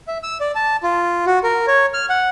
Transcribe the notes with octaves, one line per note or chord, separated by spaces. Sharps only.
E5
E6
D5
A5
F4
F#4
A#4
C#5
F6
F#5